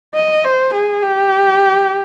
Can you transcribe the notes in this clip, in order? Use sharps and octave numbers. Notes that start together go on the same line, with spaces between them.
D#5
C5
G#4
G4